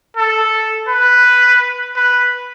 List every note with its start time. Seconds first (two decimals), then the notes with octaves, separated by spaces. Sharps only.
0.17 A4
0.89 B4
1.96 B4